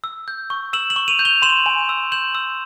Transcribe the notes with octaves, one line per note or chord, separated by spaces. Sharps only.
E6
G6
C#6
E6 E7 F#7
E7 F#7
C#6
D#7 F7
G6
F7 G7
C6 E7 F#7
G#5
E6
G6 E7 F#7
E6